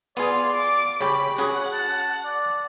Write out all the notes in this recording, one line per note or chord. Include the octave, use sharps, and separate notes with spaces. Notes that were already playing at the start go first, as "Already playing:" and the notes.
B3 F4 G#4 D5
D6
C#3 C#4 G4 B5 C#6
C#4 F#4 G#4 F#5
A5
D5